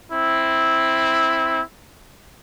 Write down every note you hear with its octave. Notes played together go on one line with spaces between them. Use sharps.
C4 E4